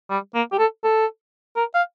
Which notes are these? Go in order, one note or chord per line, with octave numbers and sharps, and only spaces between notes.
G3
A#3
G4
A4
A4
A#4
F5